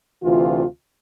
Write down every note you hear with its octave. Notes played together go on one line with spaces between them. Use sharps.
D2 C3 E3 F4